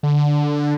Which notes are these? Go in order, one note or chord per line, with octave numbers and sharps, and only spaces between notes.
D3